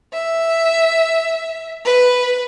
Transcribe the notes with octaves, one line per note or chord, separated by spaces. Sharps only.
E5
B4